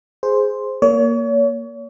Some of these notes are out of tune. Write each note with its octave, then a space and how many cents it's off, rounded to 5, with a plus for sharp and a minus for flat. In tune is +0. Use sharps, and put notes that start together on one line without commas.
G#4 +0 C5 +0
A#3 +0 C#5 +35